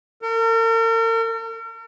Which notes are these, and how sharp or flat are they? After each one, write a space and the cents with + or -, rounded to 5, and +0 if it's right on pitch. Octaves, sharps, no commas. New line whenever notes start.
A#4 -45